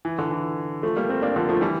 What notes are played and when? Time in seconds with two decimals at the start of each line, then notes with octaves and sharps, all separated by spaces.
0.05 E3
0.19 D3
0.31 E3
0.83 F3 A3
0.97 G3 A#3
1.09 A3 C4
1.22 A#3 D4
1.36 D3 F3
1.49 F3 A3
1.61 E3 G3